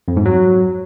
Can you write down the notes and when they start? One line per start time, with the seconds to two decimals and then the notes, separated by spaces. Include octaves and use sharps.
0.08 F2
0.17 G#2
0.25 F#3